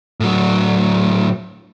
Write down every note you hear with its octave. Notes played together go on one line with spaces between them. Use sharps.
A2 F#3